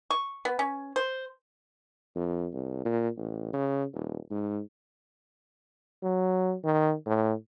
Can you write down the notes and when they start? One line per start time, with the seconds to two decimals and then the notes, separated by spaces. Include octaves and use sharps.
0.10 C#6
0.45 B3
0.59 C#4
0.96 C5
2.16 F2
2.53 C2
2.85 A#2
3.18 A1
3.53 C#3
3.94 D#1
4.30 G#2
6.02 F#3
6.64 D#3
7.06 A2